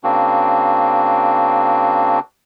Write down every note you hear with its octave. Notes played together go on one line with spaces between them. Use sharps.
C#3 A#3 C4 D4 F#4